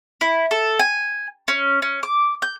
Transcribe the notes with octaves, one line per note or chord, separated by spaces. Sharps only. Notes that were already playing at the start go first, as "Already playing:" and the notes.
E4
A4
G#5
C#4
C#4
D6
G6